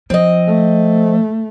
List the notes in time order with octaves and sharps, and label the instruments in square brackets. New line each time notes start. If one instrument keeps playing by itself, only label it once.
[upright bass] F3 [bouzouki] C4 D#5
[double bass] A3